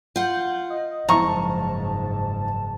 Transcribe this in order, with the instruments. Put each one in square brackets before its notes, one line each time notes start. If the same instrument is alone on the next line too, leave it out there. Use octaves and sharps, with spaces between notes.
[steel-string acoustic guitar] F4 F#5 [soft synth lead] G6
[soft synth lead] D#5
[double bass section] F#1 G#2 [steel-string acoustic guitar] F3 [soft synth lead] A5 [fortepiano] A#5 C#6